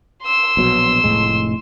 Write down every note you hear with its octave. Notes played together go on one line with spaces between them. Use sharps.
C6 E6
A#1 B2 F#3
F1 A2 G#3